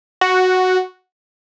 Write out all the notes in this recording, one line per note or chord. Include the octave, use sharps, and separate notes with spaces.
F#4